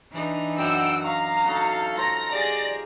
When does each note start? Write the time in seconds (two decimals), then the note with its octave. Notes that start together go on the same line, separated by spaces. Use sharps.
0.12 E3 D4 D#4
0.58 F#2 F#5 G5 E6
1.04 F5 A#5 C#6
1.45 D#4 F#4 A4
1.98 F4 C5 A#5 A#6
2.31 G4 G#4 D5